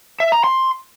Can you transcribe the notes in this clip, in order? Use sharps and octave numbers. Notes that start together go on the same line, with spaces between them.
E5
A#5
C6